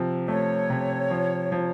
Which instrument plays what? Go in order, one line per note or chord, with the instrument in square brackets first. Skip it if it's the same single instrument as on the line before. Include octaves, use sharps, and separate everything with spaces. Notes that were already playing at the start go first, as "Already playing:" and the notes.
Already playing: [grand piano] C3 F3
[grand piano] A3 [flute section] C#5
[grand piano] C3
F3
F3